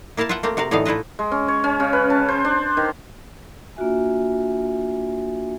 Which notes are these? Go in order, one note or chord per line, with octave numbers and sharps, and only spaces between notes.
A#3 E4 A#4 F5 A5
F4 B4 E5 F#5 G5
A3 A#3 C4 G4
C3 F#4 A#4 F5
A2 D3 E3 B3 D#4 F5
A3 E4 F4 B4 D#5
G#3
C#4
C#5
C#4
C#3
B4
A5
C5
D4
D#3
A#3 D4 F4 F#4 E5 G#5